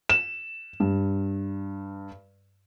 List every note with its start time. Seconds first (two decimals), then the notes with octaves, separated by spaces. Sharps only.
0.10 E7
0.80 G2